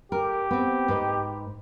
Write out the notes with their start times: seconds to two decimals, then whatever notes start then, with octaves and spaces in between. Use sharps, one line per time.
0.12 G4 A#4
0.51 B3 C4
0.88 G#2 B4 D#5